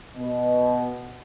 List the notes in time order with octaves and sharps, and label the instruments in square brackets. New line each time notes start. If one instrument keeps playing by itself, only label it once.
[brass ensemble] B2